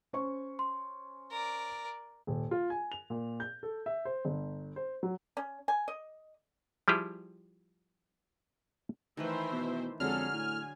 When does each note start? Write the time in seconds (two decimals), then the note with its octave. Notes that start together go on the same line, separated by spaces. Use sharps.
0.13 C#4 C5 C#6
0.59 C6
1.31 A#4 D5
2.27 D#1
2.51 F4
2.70 G#5
2.92 F7
3.10 A#2
3.40 G6
3.63 A4
3.86 E5
4.05 C5
4.25 G1
4.76 C5
5.03 F#3
5.37 C#4
5.68 G#5
5.88 D#5
6.88 F3 G3 E4 G4 G#4
9.17 D#3 E3 A3 B4 C5 E5
9.52 B2
10.00 F2 D3 F#3 G#3 C#4 G#4 A4 F6
10.33 A2 G#5